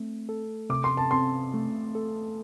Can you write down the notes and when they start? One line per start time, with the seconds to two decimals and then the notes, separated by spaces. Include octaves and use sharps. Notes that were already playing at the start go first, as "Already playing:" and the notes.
Already playing: A3 C4
0.29 A4
0.70 C3 D6
0.84 C6
0.97 A5
1.11 C4 C6
1.54 A3
1.95 A4